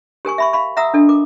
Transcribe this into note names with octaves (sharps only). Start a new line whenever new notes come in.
G4 A#4 G#5 C#6
E5 B5 C#6
F5 B5 C#6
E5 F#5 A#5 D#6 E6
D4 A4 D#5
A#4 D6